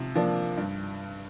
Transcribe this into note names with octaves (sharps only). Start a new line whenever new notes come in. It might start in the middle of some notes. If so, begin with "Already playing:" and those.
Already playing: C3 F3
F3 A#3 D4
G2